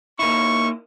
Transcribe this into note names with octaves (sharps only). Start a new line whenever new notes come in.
A#3 D#4 E4 C#6